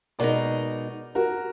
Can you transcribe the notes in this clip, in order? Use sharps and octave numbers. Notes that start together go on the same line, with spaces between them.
B2 G#3 D#4 A#4 D5
F#4 A#4